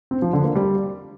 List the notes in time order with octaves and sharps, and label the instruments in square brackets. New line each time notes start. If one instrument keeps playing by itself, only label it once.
[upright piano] C4
F3
D3
A#3
G3